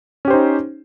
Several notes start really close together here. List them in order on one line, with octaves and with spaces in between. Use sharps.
C#4 G4 C5 D#4